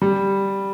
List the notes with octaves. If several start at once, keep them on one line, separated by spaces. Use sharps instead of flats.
G3